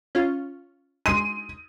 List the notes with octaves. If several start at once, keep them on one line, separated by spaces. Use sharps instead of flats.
C#4 F4
G#3 C6 D#7